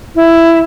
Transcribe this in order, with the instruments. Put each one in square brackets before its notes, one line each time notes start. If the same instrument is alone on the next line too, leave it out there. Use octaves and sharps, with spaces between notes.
[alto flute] E4